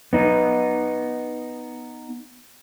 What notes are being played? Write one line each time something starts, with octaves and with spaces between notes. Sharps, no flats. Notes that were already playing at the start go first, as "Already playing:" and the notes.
B3 D#4